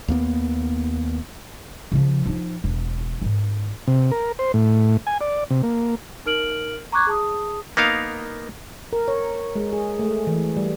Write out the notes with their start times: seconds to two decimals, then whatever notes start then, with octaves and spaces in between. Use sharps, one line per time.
0.08 D#2 A#3 B3
1.92 C#3 F3
2.26 F3 D#4
2.64 E1
3.22 G#2 D#3
3.87 C3
4.11 A#4
4.39 C5
4.54 A2
5.07 G#5
5.21 D5
5.50 C3
5.63 A#3
6.26 D#4 A#4 F6 D7 F#7
6.92 A#5 C#6 D6 F#6 G#6
7.07 G#4 A5 D#6
7.77 A#3 B3 D#4 A#4 F5
8.93 A#4
9.08 C#5
9.56 G#3
9.73 G#4
9.99 A3
10.27 E3
10.57 G3